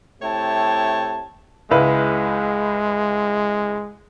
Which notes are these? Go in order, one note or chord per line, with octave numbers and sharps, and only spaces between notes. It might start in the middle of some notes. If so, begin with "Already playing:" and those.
C3 A3 E4 C#5 G5 A5
C#2 G#3 E4 B4